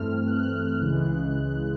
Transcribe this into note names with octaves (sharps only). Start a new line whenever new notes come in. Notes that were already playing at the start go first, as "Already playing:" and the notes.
Already playing: G2 E3 A3 C4 F6
F#6
C#2 C#3 E3 G#3